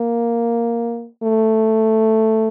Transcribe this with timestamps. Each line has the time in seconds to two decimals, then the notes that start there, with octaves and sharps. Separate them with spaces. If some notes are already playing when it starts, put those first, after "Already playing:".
Already playing: A#3
1.23 A3